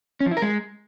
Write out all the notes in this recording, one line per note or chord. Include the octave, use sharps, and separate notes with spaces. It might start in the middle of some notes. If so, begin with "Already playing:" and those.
C#4
F3
E4
A#4
G#3